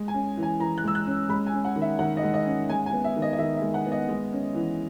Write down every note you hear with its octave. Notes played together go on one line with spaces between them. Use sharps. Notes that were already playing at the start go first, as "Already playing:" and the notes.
Already playing: G#3
G#5
C#4
E3
G#5
E3 A#5
F#6
G#3 E6
F#6
C#4
G#3 B5
G#5
C#4
F#5
D#3
E5
D#3 F#5
D#5
G#3
D#5
C#4
G#3 G#5
G#5
B3
E5
D#3
D#5
D#5
D#3 E5
E5
G#3
F#5
B3
D#5
G#3
C#4
E3